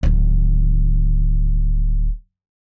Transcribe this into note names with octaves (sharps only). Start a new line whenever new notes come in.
D1 D#3